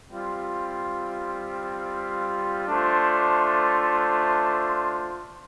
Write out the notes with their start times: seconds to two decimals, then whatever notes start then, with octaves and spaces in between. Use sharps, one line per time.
0.10 G3 C4 F4
2.66 A3 D4 F4 C5